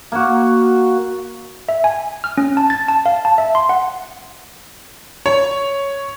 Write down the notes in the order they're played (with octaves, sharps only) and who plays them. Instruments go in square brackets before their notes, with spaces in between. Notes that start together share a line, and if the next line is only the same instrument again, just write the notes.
[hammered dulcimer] A#3 F#4
[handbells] E5
G#5
F6
C#4
A5
A6
A5
F5
A5
E5
C6
F#5
[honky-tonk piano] C#5